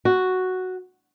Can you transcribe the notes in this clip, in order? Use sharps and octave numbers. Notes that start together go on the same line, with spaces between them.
F#4